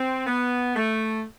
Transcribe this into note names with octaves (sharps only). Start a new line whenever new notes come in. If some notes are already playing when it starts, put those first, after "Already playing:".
Already playing: C4
B3
A3